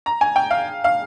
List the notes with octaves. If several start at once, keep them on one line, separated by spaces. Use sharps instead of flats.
A#5
G#5
G5
F5
F5